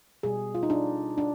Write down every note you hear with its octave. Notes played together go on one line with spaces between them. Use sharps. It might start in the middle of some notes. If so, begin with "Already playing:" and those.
B2 G3 G#4
F4
D#4
D4
D4